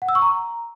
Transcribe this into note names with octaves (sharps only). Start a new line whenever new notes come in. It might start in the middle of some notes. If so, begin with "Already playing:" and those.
F#5
E6
C#6
A#5